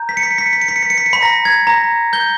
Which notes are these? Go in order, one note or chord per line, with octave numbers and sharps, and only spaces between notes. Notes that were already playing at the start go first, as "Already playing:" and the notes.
Already playing: A#5 G6
B6
C#7
B6
C#7
B6
C#7
B6
C#7
B6
C#7
B6
C#7
B6
C#7
B5 B6
A#5 A#6
G#6
A#5 A#6
G6 G7